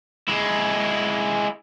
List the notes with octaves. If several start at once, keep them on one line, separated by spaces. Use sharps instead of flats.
G#3 E4